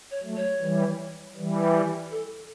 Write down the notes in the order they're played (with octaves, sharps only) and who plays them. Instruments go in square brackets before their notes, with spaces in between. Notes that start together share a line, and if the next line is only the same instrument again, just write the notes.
[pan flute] C#5
[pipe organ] F#3 A3
[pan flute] C#5
[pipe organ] E3 G3
E3 G3
[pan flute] A4